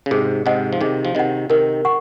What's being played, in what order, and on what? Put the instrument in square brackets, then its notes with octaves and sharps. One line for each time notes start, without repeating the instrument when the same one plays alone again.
[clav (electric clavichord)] C#3
[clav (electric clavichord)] G#2 C3 [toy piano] G#4
[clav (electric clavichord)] G#2 C3 [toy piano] D#5 F#5
[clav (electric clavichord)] F3
[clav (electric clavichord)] C3 D#3 [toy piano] G#4
[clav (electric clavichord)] F3
[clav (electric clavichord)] C3 D#3 [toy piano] D#5 F#5
[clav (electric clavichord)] C3 D#3 [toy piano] A#4
[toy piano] F#5 C#6